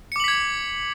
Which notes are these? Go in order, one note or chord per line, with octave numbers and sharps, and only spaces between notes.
D6 G#6 B6 C#7 F#7